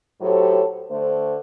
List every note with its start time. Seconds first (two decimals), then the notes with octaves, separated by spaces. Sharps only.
0.21 A2 F#3 G4 A4 C5 C#5
0.90 D3 A3 A4 C5